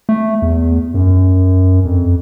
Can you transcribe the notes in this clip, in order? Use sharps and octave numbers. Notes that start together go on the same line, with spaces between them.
A3
E2
F#2
F2